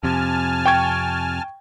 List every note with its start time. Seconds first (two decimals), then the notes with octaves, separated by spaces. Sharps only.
0.03 F2 C3 G#5 A5 F6
0.66 G5 C#6 G#6